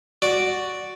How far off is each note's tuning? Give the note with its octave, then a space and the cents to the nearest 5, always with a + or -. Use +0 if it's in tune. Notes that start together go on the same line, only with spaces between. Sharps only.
F#4 +0 D5 +0